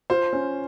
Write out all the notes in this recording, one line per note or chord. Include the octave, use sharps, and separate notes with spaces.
F4 C5
C#4